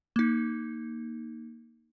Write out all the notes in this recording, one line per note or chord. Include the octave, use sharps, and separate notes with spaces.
A#3 D#4